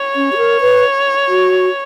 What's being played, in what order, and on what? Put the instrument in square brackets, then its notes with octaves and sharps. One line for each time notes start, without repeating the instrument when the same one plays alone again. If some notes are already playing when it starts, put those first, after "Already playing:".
Already playing: [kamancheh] C#5
[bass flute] C#4
G4
A#4
B4
F#4